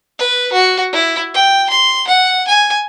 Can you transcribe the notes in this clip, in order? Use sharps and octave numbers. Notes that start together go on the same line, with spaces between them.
B4
F#4
E4
G5
C6
F#5
G#5